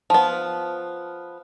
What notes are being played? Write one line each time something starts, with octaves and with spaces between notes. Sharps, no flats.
F3 B3